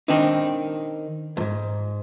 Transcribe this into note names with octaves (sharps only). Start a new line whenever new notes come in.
D#3 C4 D4 D#4
E2 G#2